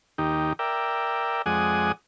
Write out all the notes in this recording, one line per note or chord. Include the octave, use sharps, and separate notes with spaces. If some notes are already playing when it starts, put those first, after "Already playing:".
D#2 D#4 G4
A#4 D5 E5 G5
F2 G#3 D5 F#5 G#5 D#6